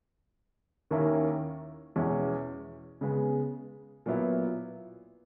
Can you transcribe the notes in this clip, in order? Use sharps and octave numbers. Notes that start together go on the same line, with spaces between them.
D#2 D#3 A#3 C#4 E4
E2 B2 G#3 C#4 E4
C#3 G#3 B3
A#2 F#3 B3 E4